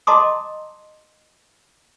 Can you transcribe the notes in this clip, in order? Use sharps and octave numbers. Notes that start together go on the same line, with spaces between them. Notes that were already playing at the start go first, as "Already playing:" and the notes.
D#5 A5 A#5 C6 D6 D#6